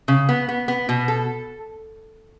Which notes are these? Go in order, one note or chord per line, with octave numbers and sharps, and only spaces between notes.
C#3
B3
B3
B3
B2
A4